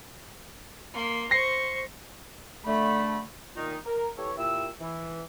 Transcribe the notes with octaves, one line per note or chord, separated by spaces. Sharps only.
A#3 C6
C5 C#6 A#6 C7
D3 A3 B5
A#2 D#3 D#4
A#4
E3 G4 A4 C#5
A#2 E4 G4 E6
E3